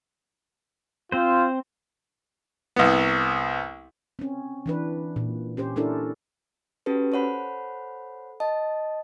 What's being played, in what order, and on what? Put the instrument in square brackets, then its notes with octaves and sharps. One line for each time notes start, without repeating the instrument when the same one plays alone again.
[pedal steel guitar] C4 C5 [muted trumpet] F4
[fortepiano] C2 B3
[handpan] C4 C#4
E3 D4 B4
A#2
C#4 G4 C5
C#4 D4 E4 A4 A#4
[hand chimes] C#4 F#4 G4 A4 B4
A4 C5 C#5 F#5 B5
D#5 A5